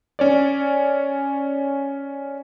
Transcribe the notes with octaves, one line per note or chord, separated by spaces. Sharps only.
C#4 C#5 D5